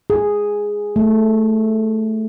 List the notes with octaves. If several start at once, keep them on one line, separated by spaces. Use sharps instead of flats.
G#4
A3